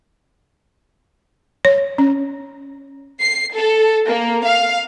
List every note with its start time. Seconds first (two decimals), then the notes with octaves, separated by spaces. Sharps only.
1.65 C#5
1.98 C#4
3.21 C7
3.54 A4
4.06 A#3
4.43 F5